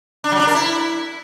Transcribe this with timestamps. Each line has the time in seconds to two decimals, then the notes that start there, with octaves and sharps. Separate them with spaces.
0.24 D4
0.32 F#3
0.40 D4
0.47 A#4
0.55 E4